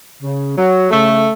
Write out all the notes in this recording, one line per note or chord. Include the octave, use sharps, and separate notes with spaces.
C#3
F#3
C#3 A3